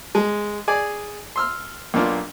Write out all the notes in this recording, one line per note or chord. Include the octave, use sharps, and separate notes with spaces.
G#3
G#4 D5 G#5
C6 E6 F6
B1 A#3 D4 F4